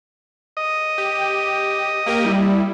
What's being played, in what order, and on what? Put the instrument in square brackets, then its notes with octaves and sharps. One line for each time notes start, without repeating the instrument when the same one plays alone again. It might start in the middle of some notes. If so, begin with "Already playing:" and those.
[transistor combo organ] D#5
[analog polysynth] G4
A#3 G4 A#4
G3 E4